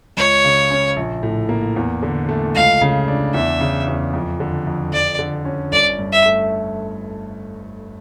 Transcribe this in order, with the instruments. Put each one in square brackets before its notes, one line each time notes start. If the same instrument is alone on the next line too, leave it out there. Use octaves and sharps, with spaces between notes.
[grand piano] C#2 [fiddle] C#5
[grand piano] C#3
C#4
A#1
A2
A#3
E2
D3
A3
[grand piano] C#2 [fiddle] F5
[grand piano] C#3
D4
[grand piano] E2 [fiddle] E5
[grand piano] C#3
E2
F2
D3
F2
[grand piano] F2 [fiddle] D5
[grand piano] D3
C#4
[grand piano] G1 [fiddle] D5
[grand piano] G2
[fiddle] E5
[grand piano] A3